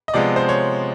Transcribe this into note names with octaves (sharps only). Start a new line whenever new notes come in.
D#5
C3 F3 G#3 B3 D5
C5
C#5